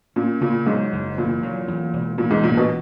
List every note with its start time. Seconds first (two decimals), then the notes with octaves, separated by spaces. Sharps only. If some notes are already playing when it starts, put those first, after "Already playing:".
0.16 A#2 C#4
0.41 A#2 C#3
0.67 G#2 F#3
0.93 F#1
1.18 E2 A#2
1.43 F#3
1.67 E2
1.93 E1
2.18 A#2 E3
2.31 G#2
2.43 E1 A#2
2.57 B2